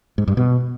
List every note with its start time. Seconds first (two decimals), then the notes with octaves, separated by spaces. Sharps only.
0.18 G#2
0.27 G2
0.37 B2